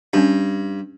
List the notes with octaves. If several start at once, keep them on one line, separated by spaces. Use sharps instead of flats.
G2 C#4 D4